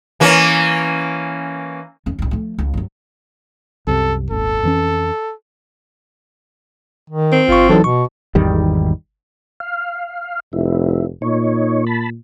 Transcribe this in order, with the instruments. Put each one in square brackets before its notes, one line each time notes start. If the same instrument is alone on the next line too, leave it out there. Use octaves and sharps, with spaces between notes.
[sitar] E3 A#3 C#4
[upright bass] E1 C#4
C2 G2
F3 A3
C#2
G2 F#3
[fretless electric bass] C2 F#2 C3 [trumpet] A4
[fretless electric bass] D#1 G#1 [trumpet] A4
[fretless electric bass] F2 E3 C#4
[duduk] D#3
[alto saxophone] C4
[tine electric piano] G1 C#6 [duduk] F4
[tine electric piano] E3 F#3 D#4 [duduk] A4
[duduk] B2 [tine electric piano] C#6
[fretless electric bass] G#1 E2 D#3 G3
[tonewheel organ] F5
[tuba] F1 [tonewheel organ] E4
[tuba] A#2 [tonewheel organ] D#4 C#5
[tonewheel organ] A5 B5